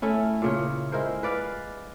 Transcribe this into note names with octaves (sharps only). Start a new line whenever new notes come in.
A3 C#4 E4
A#2 C#3 C#5
G#3 E4 A#4 C5
B4 D5 F5